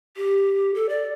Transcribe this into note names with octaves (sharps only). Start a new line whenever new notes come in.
G4
A4
D5